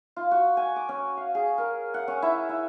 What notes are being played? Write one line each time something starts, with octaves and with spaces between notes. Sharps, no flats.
F4
F#4
G#5
D6
C#4
F5
G#4
A#4
F#5
C#4
E4
E4